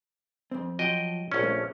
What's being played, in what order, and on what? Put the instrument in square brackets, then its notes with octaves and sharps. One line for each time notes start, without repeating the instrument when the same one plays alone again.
[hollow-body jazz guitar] F2 C4
[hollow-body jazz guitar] F3 F#3 [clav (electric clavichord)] D#5 G5
[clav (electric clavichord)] A#1 C#4
[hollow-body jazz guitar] A3